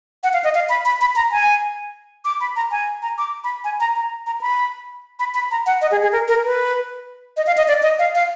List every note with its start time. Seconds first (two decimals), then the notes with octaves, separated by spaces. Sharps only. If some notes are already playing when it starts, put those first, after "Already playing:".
0.23 F#5
0.33 F5
0.44 D#5
0.55 F5
0.69 B5
0.85 B5
1.01 B5
1.16 A#5
1.32 G#5
2.25 D6
2.40 B5
2.56 A#5
2.71 G#5
3.02 A#5
3.18 D6
3.44 B5
3.64 G#5
3.80 A#5
3.96 A#5
4.26 A#5
4.41 B5
5.19 B5
5.34 B5
5.51 A#5
5.66 F#5
5.81 D#5
5.91 G#4
6.02 G#4
6.12 A#4
6.28 A#4
6.44 B4
7.37 D#5
7.47 F5
7.57 D#5
7.68 D5
7.83 D#5
7.99 F5
8.15 F5